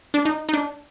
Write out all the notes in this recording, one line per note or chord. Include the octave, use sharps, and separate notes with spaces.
D4
D#4
D#4
D4